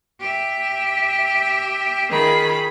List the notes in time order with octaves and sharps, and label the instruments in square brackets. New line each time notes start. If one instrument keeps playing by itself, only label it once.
[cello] G4 E5
[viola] D#3 B5 [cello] F4 G#4